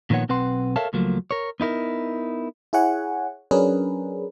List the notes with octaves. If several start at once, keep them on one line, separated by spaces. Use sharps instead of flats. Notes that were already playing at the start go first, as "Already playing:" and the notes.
A#2 D#3 F3 B3 C#5 F#5
B1 C4 B4 F#5 C6
A4 A#4 C#5 E5 F5 A5
C#2 F3 F#3 A3 A#3
A#4 C#5
B3 D#4 E4 A#4
E4 G#4 C#5 F#5 G#5
F#3 C#4 D4 G#4 A#4 B4